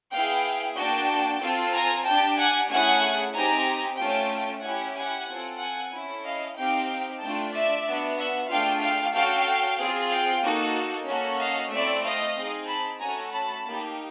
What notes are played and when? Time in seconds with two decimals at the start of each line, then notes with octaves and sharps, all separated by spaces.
0.14 B3 E4 G#4 F5 G5
0.78 A#3 D4 F#4 G5 A5
1.42 C4 F4 A4
1.74 G#5 A#5
2.07 D4 G4 G5 A5
2.39 F#5 G#5
2.71 A3 C#4 E4 G#4 F#5 G#5
3.35 C4 D#4 G4 G#5 A#5
4.00 A3 C#4 F4 G5 A5
4.64 C#4 E4 G4 F#5 G#5
4.97 F#5 G#5
5.29 C4 F4 A4
5.61 F#5 G#5
5.94 C#4 E4 A4
6.25 D#5 F5
6.57 C4 D#4 G4 F5 G5
7.22 A3 D4 F4 G5 A5
7.54 D5 E5
7.87 B3 D4 F#4
8.18 E5 F#5
8.51 A3 D4 F4 G#4 F5 G5
8.83 F5 G5
9.15 C#4 F#4 A4 F5 G5
9.79 C4 F4 G#4
10.12 F5 G5
10.45 A#3 D#4 F#4 A4
11.09 A#3 C#4 F#4 A4
11.41 D#5 F5
11.73 A3 C4 E4 D5 E5
12.05 D#5 F5
12.37 C4 D#4 G#4
12.69 A5 B5
13.01 A3 C#4 F#4 A4 G#5 A#5
13.33 A5 B5
13.66 A#3 D#4 G4